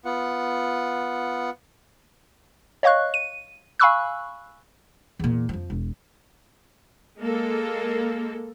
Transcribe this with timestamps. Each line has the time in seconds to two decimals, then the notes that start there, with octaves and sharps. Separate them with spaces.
0.05 B3 F4 F#5
2.83 C#5 D#5 F5 C#6 F#6
3.14 D#7
3.80 F5 G#5 B5 C#6 E6 F#6
5.19 E2 A#2
5.49 F2 F3
5.70 E1
7.19 G#3 A#3 A4